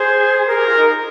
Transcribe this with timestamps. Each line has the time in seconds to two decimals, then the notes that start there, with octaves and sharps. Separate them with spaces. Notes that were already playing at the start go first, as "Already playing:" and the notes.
Already playing: G#4 C5
0.48 G#4 A#4
0.57 G4
0.67 F4
0.77 D#4